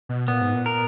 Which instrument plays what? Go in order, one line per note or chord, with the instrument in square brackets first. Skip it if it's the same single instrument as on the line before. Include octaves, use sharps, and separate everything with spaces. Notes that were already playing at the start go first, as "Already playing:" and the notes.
[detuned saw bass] B2
[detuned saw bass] A#2 [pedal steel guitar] B3
[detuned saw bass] G#2
A#2
[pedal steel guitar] A#4